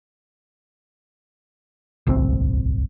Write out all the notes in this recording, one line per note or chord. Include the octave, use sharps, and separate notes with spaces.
D1 G1 C2 C4